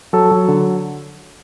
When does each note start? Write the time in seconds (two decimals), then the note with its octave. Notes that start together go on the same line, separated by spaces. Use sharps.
0.13 F#3 A4
0.31 F#3
0.48 D3